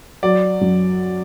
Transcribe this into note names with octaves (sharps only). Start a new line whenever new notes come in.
F#3 D5
F#2